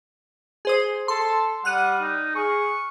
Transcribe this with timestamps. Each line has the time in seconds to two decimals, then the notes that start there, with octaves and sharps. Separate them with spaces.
0.65 G#4 C5 D#6
1.08 A4 C6
1.65 G3 F#5 F6 F#6 D#7
2.01 D#4
2.35 G#4 C#6